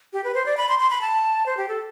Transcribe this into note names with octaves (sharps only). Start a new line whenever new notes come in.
G4
B4
C5
D5
B5
C6
C6
B5
A5
C5
G4
A4